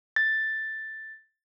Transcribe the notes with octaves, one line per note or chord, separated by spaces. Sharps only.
A6